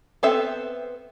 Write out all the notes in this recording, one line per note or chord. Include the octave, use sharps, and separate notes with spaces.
B3 C4 A4 E5